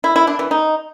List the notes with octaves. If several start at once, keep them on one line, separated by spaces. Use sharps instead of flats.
E4
E4
D4
E3
D#4